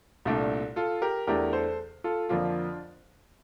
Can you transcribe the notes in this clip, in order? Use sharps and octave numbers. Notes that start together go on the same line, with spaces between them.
C2 A#2 A3 D4
F4 A4
G4 A#4
E2 E3 A3 D4 G4 A#4
A4 C5
F4 A4
F2 D3 F3 A#3 D4 F4